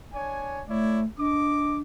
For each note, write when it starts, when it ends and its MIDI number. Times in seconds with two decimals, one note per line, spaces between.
0.13 0.62 62
0.13 0.62 73
0.13 0.62 80
0.68 1.05 57
0.68 1.00 64
0.68 1.00 73
0.68 1.00 74
1.18 1.82 62
1.18 1.76 75
1.18 1.76 86